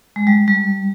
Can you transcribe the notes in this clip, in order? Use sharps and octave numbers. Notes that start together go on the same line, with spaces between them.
G#3
G3
G3